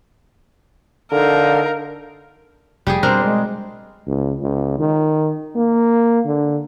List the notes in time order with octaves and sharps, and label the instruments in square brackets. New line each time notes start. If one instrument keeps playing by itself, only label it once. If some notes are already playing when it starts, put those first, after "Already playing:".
[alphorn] D3 [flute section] D#4 A4 F5 [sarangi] A#4
[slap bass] F1 [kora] G3 G4 G#4
[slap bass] B2 G3 [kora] C4 D4 A#4 [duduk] C5
[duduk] G#3
[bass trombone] C#2
C#2
D#3
A#3
D3